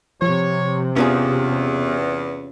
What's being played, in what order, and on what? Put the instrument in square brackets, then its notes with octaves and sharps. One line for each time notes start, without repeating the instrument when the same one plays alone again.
[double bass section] C3 [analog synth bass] F3 [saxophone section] C#5
[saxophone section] E2 [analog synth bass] B3 [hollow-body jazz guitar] C#4 F4 G#4